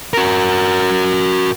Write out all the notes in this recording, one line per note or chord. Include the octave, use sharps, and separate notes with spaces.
F#4 A#4